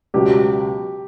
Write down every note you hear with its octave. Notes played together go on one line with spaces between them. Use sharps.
C#2 B2 F#3 G4